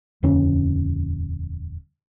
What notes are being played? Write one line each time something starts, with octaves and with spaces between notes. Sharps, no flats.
D#1 F2 D3 C#4